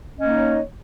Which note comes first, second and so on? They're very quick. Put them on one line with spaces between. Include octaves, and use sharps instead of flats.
C#4 D#5 A#3 D#4 C#5